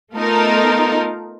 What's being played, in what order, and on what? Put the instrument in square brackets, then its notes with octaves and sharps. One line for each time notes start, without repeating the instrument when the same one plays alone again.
[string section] A3 B3 D#4 F4 A4 A#4